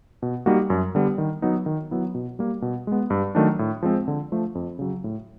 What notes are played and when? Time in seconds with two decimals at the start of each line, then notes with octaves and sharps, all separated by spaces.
0.22 B2
0.46 G3 A#3 D#4 F#4
0.70 F#2
0.95 D3 G3 B3
1.18 D#3
1.42 F#3 B3 D#4
1.66 D#3
1.91 F#3 B3 E4
2.15 B2
2.39 G3 A#3
2.62 B2
2.87 G#3 B3
3.10 G2
3.35 D#3 F#3 A3 D4
3.59 A2
3.83 F3 G#3 C4
4.08 D3
4.32 F3 A3
4.55 F2
4.79 C#3 F#3
5.04 A2